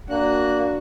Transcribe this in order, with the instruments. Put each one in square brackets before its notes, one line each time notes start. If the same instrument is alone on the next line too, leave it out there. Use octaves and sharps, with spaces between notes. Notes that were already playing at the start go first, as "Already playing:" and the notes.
[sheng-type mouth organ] A#3 F#6 [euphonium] D4 [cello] F#4